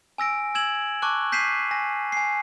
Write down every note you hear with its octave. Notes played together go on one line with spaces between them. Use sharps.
G#5 E6 A#6 D7
E6 G#6 E7 F#7
A5 C#6 D6 F#6
G6 B6 C7 D#7 E7
G#5 A#6
G#5 C7